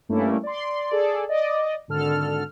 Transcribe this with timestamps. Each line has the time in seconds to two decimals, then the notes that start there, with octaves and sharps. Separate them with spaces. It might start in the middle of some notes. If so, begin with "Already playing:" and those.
0.09 G2 A3 A#3 C#4 E4
0.43 D5 C6
0.91 G#4 A4 D5
1.29 D5 D#5
1.88 G#1 D3 A4 F6